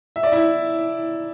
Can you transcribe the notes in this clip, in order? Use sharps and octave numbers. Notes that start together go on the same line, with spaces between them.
E5
D5
E4 E5